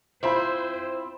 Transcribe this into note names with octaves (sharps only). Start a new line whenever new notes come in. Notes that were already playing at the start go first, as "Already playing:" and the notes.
C4 E4 F4 C5 B5